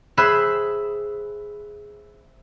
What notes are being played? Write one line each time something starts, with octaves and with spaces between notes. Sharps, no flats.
G#4 C5 E5 B5 E6 F#6